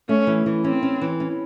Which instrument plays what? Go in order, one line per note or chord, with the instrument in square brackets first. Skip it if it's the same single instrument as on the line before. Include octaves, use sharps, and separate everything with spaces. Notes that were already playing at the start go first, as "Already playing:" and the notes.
[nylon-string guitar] A3 [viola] C#4
[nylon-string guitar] E3
E3
[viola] C4 [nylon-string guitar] C#4
[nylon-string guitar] C#4
E3
C#4